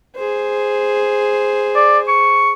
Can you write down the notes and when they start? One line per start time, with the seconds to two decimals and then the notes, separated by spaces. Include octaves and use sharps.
0.16 G#4 C5
1.75 D5
2.08 C#6